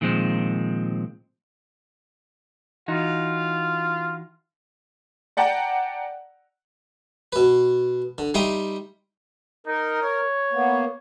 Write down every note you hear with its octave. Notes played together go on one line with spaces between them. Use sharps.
A#2 D#3 F3 G#3 C4
E3 D#4 F4 F#4
D5 F#5 G5 A5 A#5
B2 B4
D3
G3 D#4 E5 G5 C6 D#6
D#4 A#4
C#5
A#3 B3